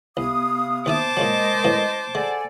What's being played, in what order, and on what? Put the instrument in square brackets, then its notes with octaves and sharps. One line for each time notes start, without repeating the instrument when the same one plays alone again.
[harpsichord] C2 [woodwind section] C3 F5 D#6 [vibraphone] B3
[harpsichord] D#2 D#4 E5 [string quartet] C5 A5 D6
[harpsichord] A#2 C#3 F#3 [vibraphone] G#3 A#4 D#6 [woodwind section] D#5
[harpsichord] F#2 A2 B3
[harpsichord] G#3 [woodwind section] A4 D5 G#5 [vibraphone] F#5